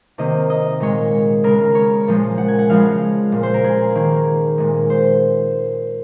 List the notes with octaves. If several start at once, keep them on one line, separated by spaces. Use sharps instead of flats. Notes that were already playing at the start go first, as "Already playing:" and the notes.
C3 D#3 A#3 D#5
D#5
A#2 G#3 C#5
C#3 G#3 A#4
C#5
A#2 F3 G#3
F#5
G#5
F#5
C#3 F3 G#3 F5
A#2 G#3
C5
A#4
G#4
D#3 A#3
A#2 G#3
C5